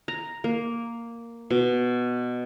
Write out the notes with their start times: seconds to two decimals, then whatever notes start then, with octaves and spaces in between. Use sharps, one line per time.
0.08 A#5
0.44 A#3
1.50 B2